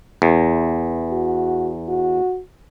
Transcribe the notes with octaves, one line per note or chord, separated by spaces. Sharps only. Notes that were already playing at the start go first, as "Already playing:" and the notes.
E2
F#4
F#4